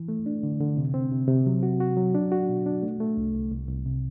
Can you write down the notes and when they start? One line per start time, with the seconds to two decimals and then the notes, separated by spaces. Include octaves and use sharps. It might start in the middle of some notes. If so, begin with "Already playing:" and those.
Already playing: E3
0.08 A3
0.26 D4
0.43 D3
0.60 D3
0.77 C3
0.94 C4
1.11 C3
1.28 C3
1.46 F#3
1.63 F#4
1.80 F#4
1.97 F#3
2.14 D4
2.32 F#4
2.49 B2
2.66 D4
2.82 A3
3.00 A3
3.17 C2
3.34 C2
3.52 C2
3.69 C2
3.86 C3